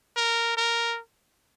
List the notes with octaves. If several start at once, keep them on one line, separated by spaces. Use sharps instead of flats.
A#4
A#4